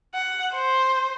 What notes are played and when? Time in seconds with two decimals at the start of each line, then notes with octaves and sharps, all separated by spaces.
0.15 F#5
0.55 C5